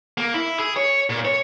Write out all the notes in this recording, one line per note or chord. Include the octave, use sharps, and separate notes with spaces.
A#3
E4
G#4
C#5
A#2
C#5